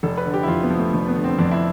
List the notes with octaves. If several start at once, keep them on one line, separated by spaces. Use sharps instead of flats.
F1 A4
B4
D3
G4
E4
F2 F4
B3
F3
A3
F1 A3
B3
D3
C4
F2 D4
E4